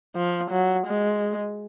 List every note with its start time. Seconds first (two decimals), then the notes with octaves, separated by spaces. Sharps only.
0.16 F3
0.51 F#3
0.87 G#3